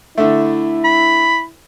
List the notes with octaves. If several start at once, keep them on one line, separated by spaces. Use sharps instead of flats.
D3 A3 E4
B5